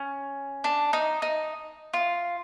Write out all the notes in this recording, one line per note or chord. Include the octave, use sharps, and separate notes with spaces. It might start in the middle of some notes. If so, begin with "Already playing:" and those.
Already playing: C#4
D4
D#4
D#4
F4